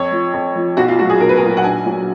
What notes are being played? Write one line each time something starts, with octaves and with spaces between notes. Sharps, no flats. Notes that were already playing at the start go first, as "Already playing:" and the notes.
Already playing: F2 C#5
F3
F2
F3
B1 F#4
F4
A#2 F#3 F#4
G#4
B1 A#4
B4
A#4
A#2 F#3
F#5
A#1 G#5
A#2 F#3